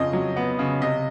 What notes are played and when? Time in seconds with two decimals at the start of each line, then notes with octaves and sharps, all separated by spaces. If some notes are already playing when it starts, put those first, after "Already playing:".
Already playing: F2 C#3 D#5
0.13 F#3
0.36 B3
0.59 C#3
0.81 C3 D#5